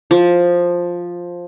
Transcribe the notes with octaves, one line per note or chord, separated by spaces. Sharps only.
F3